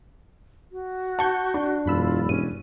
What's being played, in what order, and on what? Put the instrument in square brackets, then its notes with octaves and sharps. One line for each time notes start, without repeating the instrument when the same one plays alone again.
[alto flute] F#4
[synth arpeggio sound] F#5 C#6 G6 [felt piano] A5
[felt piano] D4
[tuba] E1 [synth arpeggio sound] F#2 B5 E6 [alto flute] F4
[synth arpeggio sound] G2 D#7 [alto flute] C#4